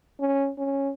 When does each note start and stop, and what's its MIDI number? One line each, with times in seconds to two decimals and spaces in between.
0.20 0.51 61
0.59 0.92 61